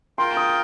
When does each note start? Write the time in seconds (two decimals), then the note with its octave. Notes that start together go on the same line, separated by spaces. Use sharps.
0.18 F4 A#4 G5 C6
0.37 D#6